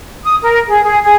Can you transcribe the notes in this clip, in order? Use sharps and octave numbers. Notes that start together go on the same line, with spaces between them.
D#6
A#4
G#4
G#4
G#4